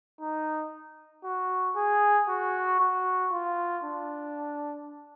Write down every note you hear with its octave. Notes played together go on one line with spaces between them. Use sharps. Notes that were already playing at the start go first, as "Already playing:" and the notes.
D#4
F#4
G#4
F#4
F#4
F4
D4